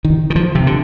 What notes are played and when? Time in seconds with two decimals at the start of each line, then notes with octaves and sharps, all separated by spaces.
0.05 D#3
0.30 D#3
0.36 F3
0.55 C3
0.67 D3